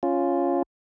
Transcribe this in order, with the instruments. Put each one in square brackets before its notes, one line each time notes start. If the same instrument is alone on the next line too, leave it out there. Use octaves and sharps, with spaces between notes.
[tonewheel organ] C#4 F4